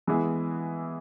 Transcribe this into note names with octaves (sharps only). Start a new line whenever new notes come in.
E3 G#3 B3 E4 G#4